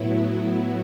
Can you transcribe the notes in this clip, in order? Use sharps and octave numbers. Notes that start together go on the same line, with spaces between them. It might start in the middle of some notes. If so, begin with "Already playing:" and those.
Already playing: A2 F#3 B3 E4